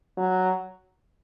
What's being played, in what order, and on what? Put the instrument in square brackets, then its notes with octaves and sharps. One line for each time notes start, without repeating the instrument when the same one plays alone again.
[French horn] F#3